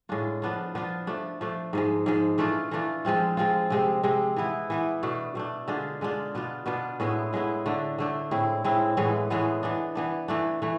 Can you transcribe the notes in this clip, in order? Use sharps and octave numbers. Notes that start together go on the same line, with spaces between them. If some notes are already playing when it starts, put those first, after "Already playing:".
A2 G#3 D4 F4
F3 B3 D4 F4
F3 B3 D4 F4
F3 A3 D4
F3 A3 D4
G#2 F3 G#3
G#2 F3 G#3
E3 A3 D4 F4
E3 A3 D4 F4
F3 G#3 C4 F4
F3 G#3 C4 F4
C3 G#3 C4
C3 G#3 C4
E3 B3 E4
E3 B3 E4
B2 A3 D4
B2 A3 D4
D3 G#3 D4 F4
D3 G#3 D4 F4
B2 B3 D4 F4
B2 B3 D4 F4
A2 G#3 B3 E4
A2 G#3 B3 E4
D3 A3 D4
D3 A3 D4
A2 G#3 C4 E4
A2 G#3 C4 E4
A2 E3 G#3 B3
A2 E3 G#3 B3
E3 B3 D4
E3 B3 D4
E3 A3 D4
E3 A3